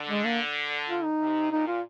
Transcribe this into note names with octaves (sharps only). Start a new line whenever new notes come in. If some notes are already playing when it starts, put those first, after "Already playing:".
Already playing: D3
G#3
A#3
F4
D#4
C3
A#2 D#4
F4